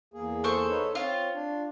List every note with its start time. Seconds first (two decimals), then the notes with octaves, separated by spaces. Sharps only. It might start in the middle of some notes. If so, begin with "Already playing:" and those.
0.14 E2 A#3 G#4
0.44 A4 C5 C#6
0.69 D#4 B4 C#5
0.95 C4 F4 C#5
1.34 D4